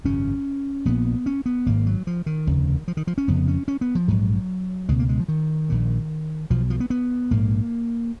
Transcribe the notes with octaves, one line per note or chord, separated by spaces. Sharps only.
G#1 F#2 C#3 C#4
A#1 A#2 B3
C#4
B3
G#1 G#2 A#3
F#3
F3
D#3
F1 D#2 C#3
F3
D#3
F3
C#4
F1 F2 C#3 B3
C#4
C#4
B3
F3
A#1 G#2 F#3
C#2 B2 G#3
A#3
G#3
F3
D#3
A#1 A#2
B1 B2 F3
F3
B3
B3
A#1 G#2 A#3